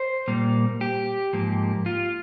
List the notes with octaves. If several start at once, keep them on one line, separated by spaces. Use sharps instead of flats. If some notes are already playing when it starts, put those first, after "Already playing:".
Already playing: C5
A#2 G3 A#3
G4
G#2 F3 A#3
F4